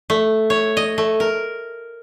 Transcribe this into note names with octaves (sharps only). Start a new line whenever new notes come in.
A3
C#5
D#5
A3
A#4